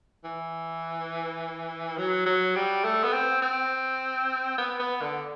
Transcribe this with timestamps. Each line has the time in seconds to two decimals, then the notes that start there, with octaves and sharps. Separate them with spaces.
0.25 E3
1.98 F#3
2.26 F#3
2.56 G3
2.84 A3
3.03 B3
3.13 C4
3.42 C4
4.58 B3
4.79 B3
5.02 D3